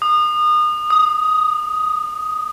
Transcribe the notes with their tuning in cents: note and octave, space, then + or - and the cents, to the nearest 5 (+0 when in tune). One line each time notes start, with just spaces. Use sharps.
D#6 -30
D#6 +10